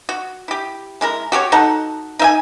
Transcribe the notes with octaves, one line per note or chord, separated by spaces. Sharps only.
F#4
E4 G4
G#3 E4 A#4
F#4 G4 A4 C#5
D#4 F#4 A4 F#5
D#4 E5 G#5